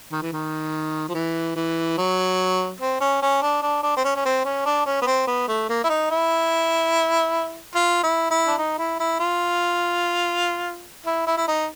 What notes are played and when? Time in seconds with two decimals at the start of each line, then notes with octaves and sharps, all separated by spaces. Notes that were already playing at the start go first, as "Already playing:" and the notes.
0.12 D#3
0.22 E3
0.32 D#3
1.09 F3
1.14 E3
1.56 E3
1.97 F#3
2.80 C4
3.00 C#4
3.22 C#4
3.42 D4
3.62 D4
3.83 D4
3.97 C4
4.04 C#4
4.16 C#4
4.25 C4
4.45 C#4
4.65 D4
4.86 C#4
5.01 B3
5.07 C4
5.27 B3
5.48 A3
5.69 A#3
5.84 E4
5.89 D#4
6.10 E4
7.75 F4
8.03 E4
8.30 E4
8.47 D4
8.58 D#4
8.78 E4
9.00 E4
9.20 F4
11.06 E4
11.27 E4
11.37 E4
11.48 D#4